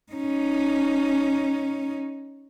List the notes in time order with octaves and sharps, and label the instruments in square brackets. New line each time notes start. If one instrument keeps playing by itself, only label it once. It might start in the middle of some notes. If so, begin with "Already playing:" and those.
[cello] C#4 D#4